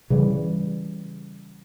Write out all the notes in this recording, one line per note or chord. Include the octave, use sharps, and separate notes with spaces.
C#3 E3 G3